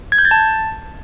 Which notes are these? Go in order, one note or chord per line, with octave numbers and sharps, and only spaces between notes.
G#6
G6
A6
A5